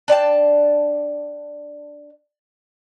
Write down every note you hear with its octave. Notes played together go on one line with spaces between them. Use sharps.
D4 D5 G5 A5